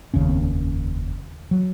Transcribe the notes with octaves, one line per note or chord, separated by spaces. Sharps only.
F1 D#2 C#3 C#4
C4
C#4
F#3